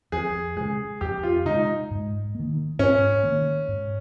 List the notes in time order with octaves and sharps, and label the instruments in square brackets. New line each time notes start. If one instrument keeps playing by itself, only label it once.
[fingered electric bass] F2 [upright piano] G#4
[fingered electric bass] C#3 G#3 [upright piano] G#4
[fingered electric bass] F2 [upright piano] G4
[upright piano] F4
[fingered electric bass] C#3 G#3 [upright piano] D#4
[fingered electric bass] G#2
D#3 A#3
[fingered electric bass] G#2 [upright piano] C#4
[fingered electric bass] D#3 A#3
G#2